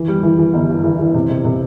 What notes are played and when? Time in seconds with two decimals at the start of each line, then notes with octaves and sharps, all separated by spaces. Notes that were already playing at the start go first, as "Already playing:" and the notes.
Already playing: E3
0.08 G3
0.23 E3
0.39 E3
0.53 G1
0.69 G2
0.84 E3
0.99 E3
1.14 C3
1.30 C3
1.45 C3